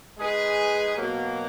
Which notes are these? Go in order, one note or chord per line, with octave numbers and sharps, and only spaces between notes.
G#3 D#4 G#4 B4
B2 F#3 A#3